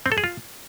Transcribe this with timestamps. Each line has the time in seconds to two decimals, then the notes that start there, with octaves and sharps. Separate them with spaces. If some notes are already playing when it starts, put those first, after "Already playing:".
0.06 C4
0.12 A4
0.18 G#4
0.24 F4